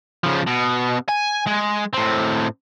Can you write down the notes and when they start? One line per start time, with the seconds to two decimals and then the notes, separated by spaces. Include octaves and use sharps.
0.24 C#3 F3
0.47 B2
1.09 G#5
1.47 G#3
1.94 A2 C4